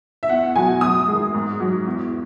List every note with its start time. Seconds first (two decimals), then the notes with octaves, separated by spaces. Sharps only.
0.23 E5
0.29 E2 F#5
0.55 B2 F#3 G#5
0.81 F#2 D#6
1.08 D#3 G#3
1.34 G#2
1.60 F#3
1.86 E2